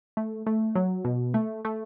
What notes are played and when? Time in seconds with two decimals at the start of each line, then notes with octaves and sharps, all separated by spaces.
0.17 A3
0.46 A3
0.75 F#3
1.05 B2
1.34 A3
1.65 A3